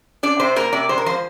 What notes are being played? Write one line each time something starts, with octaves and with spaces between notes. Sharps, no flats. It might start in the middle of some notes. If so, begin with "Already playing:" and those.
D4 D5
C3 C5
A#3 A#4
C3 D5
G#3 C5
A#4
F3 C5